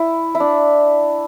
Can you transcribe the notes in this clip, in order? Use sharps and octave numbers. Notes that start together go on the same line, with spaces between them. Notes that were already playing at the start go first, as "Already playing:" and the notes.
Already playing: E4
E4
D4